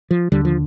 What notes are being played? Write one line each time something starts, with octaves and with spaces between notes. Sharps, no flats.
F3
D#2 D3 G3
F3